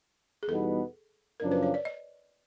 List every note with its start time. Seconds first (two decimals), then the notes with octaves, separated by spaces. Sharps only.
0.43 G#4
0.48 E2 B2 G3 B3 D#4 A4
1.40 F#2 C#3 F3 A#3 D4 A#4
1.52 B4
1.63 C#5
1.74 D5
1.85 D#5